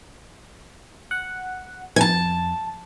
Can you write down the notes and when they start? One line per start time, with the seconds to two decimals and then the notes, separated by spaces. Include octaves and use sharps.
1.11 F#5
1.96 F2 G#5 A5